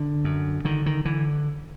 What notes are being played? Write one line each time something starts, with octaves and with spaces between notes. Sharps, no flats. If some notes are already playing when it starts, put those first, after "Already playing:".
Already playing: D3
F#2
D3 D#3
D#3
D3 E3